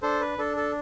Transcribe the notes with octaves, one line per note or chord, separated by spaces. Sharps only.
D4 A4 C5
B4
D4 A4
A4